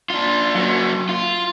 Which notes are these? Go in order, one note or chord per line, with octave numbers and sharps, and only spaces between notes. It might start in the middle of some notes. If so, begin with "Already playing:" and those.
D4 F4
F#3 A#3
F4